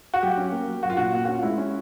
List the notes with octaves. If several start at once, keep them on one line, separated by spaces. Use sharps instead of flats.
F#4
F#3 G4
C#4
A#3
F#3
F#3 F#4
F4
A#2 F#4
A#3
C#4 F#4
F4
G#3 E4
C#4